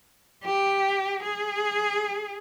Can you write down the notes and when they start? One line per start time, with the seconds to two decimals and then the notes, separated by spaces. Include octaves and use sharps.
0.44 G4
1.23 G#4